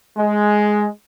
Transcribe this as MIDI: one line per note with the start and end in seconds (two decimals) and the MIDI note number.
0.17 0.87 56